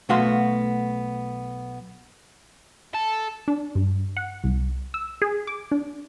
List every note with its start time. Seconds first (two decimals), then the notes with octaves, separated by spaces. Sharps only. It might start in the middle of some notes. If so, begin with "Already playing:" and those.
0.09 B1 A3 B3 F#4 F5 C6
2.94 A4
3.48 D4
3.75 G2
4.17 F#5
4.44 C2
4.94 E6
5.22 G#4
5.47 D6
5.71 D4